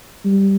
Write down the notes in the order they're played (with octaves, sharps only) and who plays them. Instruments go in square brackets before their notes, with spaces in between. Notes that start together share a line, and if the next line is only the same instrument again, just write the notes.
[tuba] G3